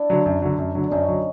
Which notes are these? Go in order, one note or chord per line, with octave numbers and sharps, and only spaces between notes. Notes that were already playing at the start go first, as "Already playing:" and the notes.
Already playing: D4 E4
D3 F#3
F#2
D3 F#3
F#2
D3 F#3
D4
F#2 C#4 D#4
D3 F#3